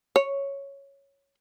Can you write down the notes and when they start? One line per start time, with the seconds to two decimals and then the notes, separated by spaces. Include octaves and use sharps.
0.16 C#5